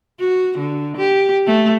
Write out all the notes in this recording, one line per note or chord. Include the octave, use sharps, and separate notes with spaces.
F#4
D3
G4
A3